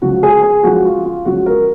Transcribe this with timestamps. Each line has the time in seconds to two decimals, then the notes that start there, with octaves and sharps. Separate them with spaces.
0.02 C#2 C#3 F3 F#4
0.23 G#4
0.43 G#4
0.63 C#2 C#3 F3 F#4
0.85 F4
1.05 F4
1.25 C#2 C#3 F3 F#4
1.46 A#4